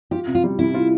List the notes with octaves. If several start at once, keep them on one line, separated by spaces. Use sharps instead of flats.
F4 G4
C3
F4
G3
C3 E4
F4